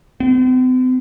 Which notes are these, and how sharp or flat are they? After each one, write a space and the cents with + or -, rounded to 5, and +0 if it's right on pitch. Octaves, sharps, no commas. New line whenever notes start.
C4 -45